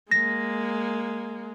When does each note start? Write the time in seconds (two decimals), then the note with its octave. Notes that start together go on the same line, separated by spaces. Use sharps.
0.11 G#3 A#3 A#6